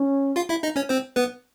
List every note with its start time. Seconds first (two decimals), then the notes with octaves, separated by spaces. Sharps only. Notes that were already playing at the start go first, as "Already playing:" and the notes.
Already playing: C#4
0.36 F4 F5
0.49 E4 E5
0.63 D#4 D#5
0.76 C#4 C#5
0.89 C4 C5
1.16 B3 B4